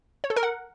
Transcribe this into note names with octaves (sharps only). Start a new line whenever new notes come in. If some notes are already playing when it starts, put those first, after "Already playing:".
C#5
A4
A#4
F#5